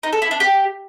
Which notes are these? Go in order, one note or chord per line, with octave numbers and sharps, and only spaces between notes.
D#4
A4
E4
D4
G4